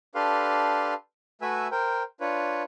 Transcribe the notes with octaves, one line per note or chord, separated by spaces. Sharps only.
D4 G4 A4 B4 F5 C6
A3 F#4 B4 E5 G#5 E6
A#4 C5 G5
D4 F4 B4 C#5